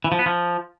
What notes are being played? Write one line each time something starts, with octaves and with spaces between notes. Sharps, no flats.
E3
F3
B3
F3